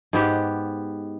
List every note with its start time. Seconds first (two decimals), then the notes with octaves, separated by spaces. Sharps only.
0.13 G#2 B3 G4